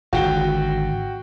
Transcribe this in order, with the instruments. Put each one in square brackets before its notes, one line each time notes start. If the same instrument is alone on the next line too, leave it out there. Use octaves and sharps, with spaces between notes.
[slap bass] G#1 D3 [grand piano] F#4 G5 G7